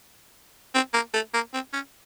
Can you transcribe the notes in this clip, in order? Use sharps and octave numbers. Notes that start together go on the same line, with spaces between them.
C4
A#3
A3
A#3
C4
C#4